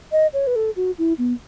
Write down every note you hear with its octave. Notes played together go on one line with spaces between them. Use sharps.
D#5
C#5
B4
A4
F#4
E4
B3